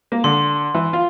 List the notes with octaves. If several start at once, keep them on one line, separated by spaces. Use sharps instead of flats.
A#3
D3 C6
E3
F4